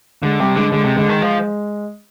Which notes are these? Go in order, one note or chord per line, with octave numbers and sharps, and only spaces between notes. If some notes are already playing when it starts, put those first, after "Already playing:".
D3 G#3
C3 G3
D3 G#3
D3 G#3
C3
D3 G#3
D#3
F3